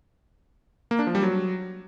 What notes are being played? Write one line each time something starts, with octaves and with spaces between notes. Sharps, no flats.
A#3
D4
F3
G3
F#3